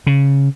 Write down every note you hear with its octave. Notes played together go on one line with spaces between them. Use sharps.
C#3